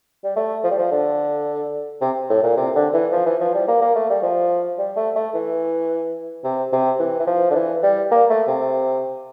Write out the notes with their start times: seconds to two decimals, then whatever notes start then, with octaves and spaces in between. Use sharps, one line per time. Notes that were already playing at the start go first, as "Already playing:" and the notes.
0.24 G3
0.37 A3
0.64 F3
0.71 G3
0.79 F3
0.91 D3
2.01 C3
2.30 A2
2.43 A#2
2.57 C3
2.76 D3
2.94 E3
3.12 F3
3.26 E3
3.41 F3
3.54 G3
3.68 A#3
3.81 A#3
3.96 A3
4.10 G3
4.23 F3
4.78 G3
4.97 A3
5.16 A3
5.35 E3
6.44 C3
6.72 C3
6.99 E3
7.20 E3
7.27 F3
7.51 D3
7.55 E3
7.83 G3
8.11 A#3
8.30 A3
8.48 C3